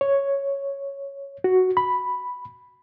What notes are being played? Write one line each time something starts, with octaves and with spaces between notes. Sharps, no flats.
C#5
F#4
B5